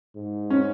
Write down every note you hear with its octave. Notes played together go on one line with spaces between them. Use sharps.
G#2
C#4